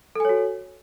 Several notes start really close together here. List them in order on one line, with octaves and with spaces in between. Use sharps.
A4 G#5 C#5 F#4